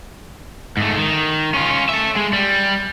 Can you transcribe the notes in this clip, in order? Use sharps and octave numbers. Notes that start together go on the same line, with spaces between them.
G#2 A3
D#3
C#4 F4
A4 E5
G#3
G3